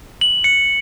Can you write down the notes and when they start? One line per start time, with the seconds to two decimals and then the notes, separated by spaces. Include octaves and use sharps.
0.21 F#7
0.44 C#7